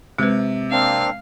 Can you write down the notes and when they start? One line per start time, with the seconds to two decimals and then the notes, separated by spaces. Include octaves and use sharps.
0.18 C3 G#3 B4
0.72 A#3 C4 D4 F5